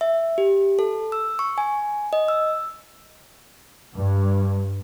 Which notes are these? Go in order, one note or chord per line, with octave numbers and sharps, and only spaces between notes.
E5
G4
A4
E6
C#6
G#5
D#5
E6
G2